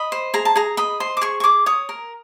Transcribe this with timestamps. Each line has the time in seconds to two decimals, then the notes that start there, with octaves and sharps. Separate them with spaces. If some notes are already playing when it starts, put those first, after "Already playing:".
Already playing: D#5 B5
0.12 C5
0.34 G#4 A#5
0.45 A5
0.55 G#4 A#5
0.77 D#5 B5
1.00 C5 C6
1.17 D6
1.21 G#4 C#6
1.40 C#6
1.44 G#4 D6
1.66 C#5 D#6
1.89 A#4